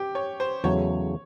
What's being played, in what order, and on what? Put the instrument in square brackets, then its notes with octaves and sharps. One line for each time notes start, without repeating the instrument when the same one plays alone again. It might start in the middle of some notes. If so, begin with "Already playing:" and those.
Already playing: [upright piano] G4
C#5
C5
[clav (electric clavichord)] E2 C#3 F#3 A3 [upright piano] C#5